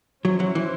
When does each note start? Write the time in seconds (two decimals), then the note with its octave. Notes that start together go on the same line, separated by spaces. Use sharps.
0.25 F#3 C#4 E4 C5
0.40 F#3
0.55 E3